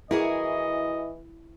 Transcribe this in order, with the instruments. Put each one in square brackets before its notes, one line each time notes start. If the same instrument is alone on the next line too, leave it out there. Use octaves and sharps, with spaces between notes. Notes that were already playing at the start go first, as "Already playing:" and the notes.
[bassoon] E3 [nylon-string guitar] E4 [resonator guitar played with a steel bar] F#4 G#4 A#4 [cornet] D#5